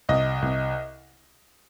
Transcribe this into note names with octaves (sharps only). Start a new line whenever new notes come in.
C2 D#5
C2